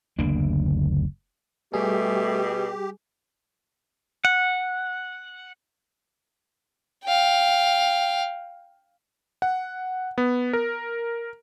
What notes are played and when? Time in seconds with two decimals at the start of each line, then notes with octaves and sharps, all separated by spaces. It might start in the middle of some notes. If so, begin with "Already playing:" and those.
0.19 F#1 D2 A#3 D4
1.74 B2 G3 A3 G4 G#4
4.25 F#5
7.05 F5 G5
9.42 F#5
10.18 B3
10.53 A#4